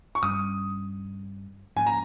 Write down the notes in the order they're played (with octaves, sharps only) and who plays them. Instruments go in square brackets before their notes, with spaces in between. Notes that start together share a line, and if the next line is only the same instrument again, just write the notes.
[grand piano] C#6
[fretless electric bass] G2 G3 C#4 [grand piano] D#6
[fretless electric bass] G#2 F3 A#3 C#4 [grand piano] G#5
[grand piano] A#5